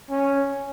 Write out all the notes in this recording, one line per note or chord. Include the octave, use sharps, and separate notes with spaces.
C#4